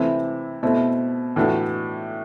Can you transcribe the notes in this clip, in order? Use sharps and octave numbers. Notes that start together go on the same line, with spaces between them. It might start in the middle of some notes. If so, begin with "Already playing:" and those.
Already playing: C3 E3 A3 C4 E4
B2 A3 C4 E4
A2 E3 A3 D4 F#4